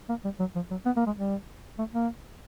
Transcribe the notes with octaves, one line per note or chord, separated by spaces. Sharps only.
A#3
G3
F#3
F3
F#3
B3
A#3
G#3
G3
A3
A#3